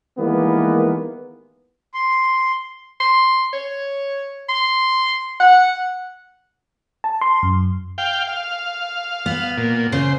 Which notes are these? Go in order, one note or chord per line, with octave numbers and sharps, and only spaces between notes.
D#3 E3 G3 G#3 A#3 B3
C6
C6
C#5
C6
F#5
A5
C6
F#2
F5 G5
F5
B3
A#2
C#3 C5